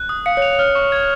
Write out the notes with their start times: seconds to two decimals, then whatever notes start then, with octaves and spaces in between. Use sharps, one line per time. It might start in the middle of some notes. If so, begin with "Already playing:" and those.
Already playing: F#6
0.09 D#6
0.26 F5 C#7
0.37 C#5
0.42 F7
0.59 C#5 F6
0.75 C#6
0.92 G#6